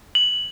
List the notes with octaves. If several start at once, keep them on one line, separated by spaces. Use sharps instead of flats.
F#7